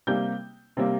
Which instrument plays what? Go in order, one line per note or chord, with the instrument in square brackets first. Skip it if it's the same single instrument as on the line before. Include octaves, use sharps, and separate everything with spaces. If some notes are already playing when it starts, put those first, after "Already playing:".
[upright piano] C3 G3 A#3 G6
C3 G3 A#3